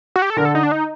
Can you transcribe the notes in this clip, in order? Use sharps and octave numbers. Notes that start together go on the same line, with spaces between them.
F#4
G4
A4
D3 D4 A#4
A4
D#4
D4
D#4